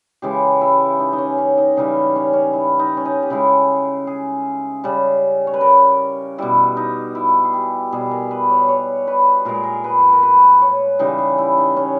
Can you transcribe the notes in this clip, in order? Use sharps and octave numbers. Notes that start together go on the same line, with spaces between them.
C#3 E3 G#3 G4
E4
D#4
D#4
C#4
C#4
D#4
C#3 E3 G3 D#4
C#4
C#4
E4
D#4
C#4
D#4
G4
C#3 G#3 E4
G#4
C#3 G3
C#5
B4
A#4
B2 G3 E4
D#4
E4
G#4
G4
B2 G3 G#4
A#4
B4
C#5
C#5
B4
A#2 G#3 A#4
G#4
A#4
B4
A#4
B4
C#5
C#3 E3 G3 D#4
G#4
E4
D#4
C#4